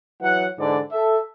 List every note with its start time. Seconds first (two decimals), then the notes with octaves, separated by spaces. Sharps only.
0.21 E3 F#3 F#5
0.59 G#2 D3 E3 D5
0.91 A4 E5